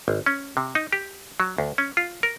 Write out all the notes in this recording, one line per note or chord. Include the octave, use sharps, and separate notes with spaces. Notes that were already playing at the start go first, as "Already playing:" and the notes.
G#1
C#4
C3
D#4
G4
F#3
D2
C#4
F4
A#4